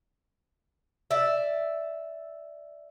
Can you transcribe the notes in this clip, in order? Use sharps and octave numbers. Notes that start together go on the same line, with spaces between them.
D5 E5